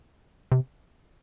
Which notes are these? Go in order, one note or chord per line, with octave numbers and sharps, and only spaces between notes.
C3